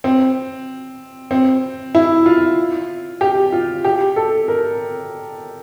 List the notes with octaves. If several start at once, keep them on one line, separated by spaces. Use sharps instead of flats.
C4
C4
E4
F4
G4
F4
G4
A4
A#4